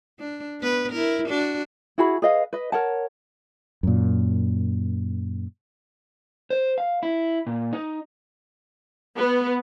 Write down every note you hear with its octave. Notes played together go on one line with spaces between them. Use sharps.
D4
B3 B4
E4 A#4
D4 F#4
E4 F#4 G#4 B5
G#4 B4 D#5 F5
B4 D#5
A#4 C#5 F#5 A5
F#2 A#2
C5
F5
E4
A#2
D#4
B3